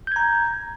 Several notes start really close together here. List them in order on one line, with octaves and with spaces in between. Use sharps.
G6 G#6 A#5